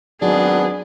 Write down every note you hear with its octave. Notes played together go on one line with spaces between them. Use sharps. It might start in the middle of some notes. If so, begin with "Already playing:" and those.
G#1 F#3 B3 D4 G#4